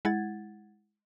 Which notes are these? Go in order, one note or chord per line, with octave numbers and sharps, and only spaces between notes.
G#3 E4 F#5 G#6 A6